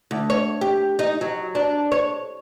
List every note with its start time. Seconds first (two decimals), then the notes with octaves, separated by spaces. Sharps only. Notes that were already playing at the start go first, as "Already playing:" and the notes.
0.11 D2
0.30 C#5
0.61 G4
0.99 D#4
1.21 F#3
1.55 D4
1.92 C#5